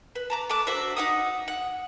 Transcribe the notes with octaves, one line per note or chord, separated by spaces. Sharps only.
B4
A5 A#5 D6
A3 A5 D6 F#6
D4 F#4 C5 E5
D#4 F#5 D#6
F#5